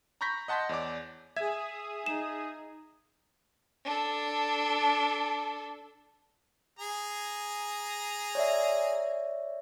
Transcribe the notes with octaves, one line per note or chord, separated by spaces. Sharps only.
A#5 B5 C#6 G6 A#6 B6
D#5 F#5 A5 C6 G6 B6
E2 C#5 D5 D6
G#4 E5 D#6 G#6
D#4 E7
D4 A4
G#4 A#5
C#5 D5 E5